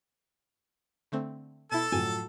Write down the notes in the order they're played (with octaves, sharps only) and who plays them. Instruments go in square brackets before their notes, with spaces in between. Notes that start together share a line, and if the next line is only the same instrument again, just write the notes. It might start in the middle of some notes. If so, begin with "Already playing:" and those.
[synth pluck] D3 A3 C4
[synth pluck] B2 E4 [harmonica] A4 A5
[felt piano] A2 F3 F#3 [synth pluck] G#5